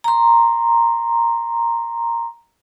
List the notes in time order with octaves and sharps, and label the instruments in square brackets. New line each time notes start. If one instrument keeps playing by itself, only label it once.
[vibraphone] A#5 C6